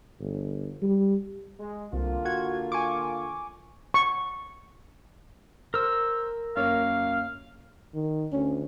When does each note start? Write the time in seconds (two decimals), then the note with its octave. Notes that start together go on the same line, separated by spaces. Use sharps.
0.19 G1
0.82 G3
1.59 G#3
1.93 C2 D3 A#3 F4
2.25 F#4 G#6
2.72 G#5 C#6 D6
3.94 C#6
5.74 A#4 C5 E6
6.56 F#2 A#3 C#5 F5
7.94 D#3
8.32 D2 C#4